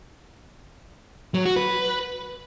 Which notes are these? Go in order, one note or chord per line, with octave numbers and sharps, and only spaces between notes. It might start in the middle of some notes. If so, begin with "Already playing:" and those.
F#3
F#4
B4